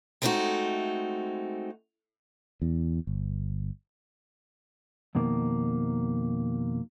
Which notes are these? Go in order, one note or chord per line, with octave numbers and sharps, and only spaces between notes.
G#3 A3 C4 C#4 D#4 F#4
E2
G1
F2 B2 D#3 A#3